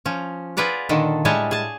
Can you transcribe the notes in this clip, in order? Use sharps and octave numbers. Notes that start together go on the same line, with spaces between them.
F3 C#4
F4 G#4 B4 D5 F#5
A#2 D3 D#3 A4
A2 G3 G#3 C#5 G#5 A5
G#4 A5